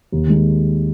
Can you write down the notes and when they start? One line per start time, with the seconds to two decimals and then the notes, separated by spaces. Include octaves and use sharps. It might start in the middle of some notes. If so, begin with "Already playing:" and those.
0.12 D#2
0.27 D#3 G#3